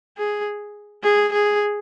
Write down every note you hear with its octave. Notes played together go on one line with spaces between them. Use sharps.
G#4
G#4
G#4